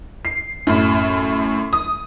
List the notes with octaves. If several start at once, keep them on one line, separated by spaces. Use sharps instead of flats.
C7
F#2 A2
D#6